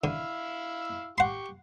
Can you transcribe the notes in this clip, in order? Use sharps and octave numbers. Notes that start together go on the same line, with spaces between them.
D3 E4 F5 E6
G4 F#5 C6 C#6